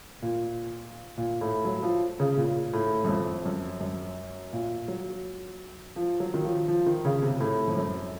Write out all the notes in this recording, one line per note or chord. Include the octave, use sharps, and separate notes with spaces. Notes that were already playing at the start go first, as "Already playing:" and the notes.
A#2
A#2
A2
F#3
F3
C#3
A#2
A2
F#2
F2
F#2
F#2
A#2
F#3
F3
F#3
D#3
F3
F3
D#3
C#3
C3
A2
F2
F#2